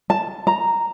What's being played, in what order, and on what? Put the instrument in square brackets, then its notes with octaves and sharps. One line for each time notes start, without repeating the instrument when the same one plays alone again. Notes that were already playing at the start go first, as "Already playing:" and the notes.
[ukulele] A5
A#5